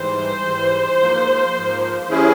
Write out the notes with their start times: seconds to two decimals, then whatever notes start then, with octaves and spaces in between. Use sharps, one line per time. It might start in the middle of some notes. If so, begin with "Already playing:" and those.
Already playing: G#2 E3 G3 C5
0.44 G#2 E3 G3
0.99 G#2 F3 A#3
1.54 G#2 F3 A#3
2.09 E3 G3 C#4 E4 G#4